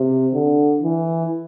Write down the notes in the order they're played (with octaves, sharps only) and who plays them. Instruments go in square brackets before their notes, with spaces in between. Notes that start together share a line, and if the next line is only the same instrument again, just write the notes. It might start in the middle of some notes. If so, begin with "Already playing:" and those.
Already playing: [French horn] C3
D3
E3